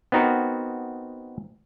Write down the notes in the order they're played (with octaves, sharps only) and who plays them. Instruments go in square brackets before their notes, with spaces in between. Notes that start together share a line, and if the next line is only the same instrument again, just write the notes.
[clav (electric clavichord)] B3 C4 D#4 F#4 A#4